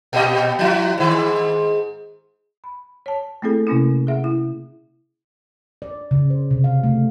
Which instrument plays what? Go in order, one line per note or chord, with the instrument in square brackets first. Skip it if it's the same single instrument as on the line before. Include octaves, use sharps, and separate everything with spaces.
[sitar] A#2 G4 D#5
F3 E4 F#4
G#2 D#3
[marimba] B5
C#5 A5
A3 A#3 C4 E4 G#4 A4
C3 A#3 C#4 E4
G#4 E5 F#5
E4
[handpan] D5
C#3
C5
C3
F5
A3